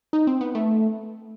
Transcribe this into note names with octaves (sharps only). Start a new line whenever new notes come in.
D#4
C4
B3
A3